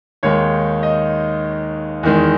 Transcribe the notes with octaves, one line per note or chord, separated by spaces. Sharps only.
D#2 D#3 G#3 C#5
D#5
E2 D#3 G#3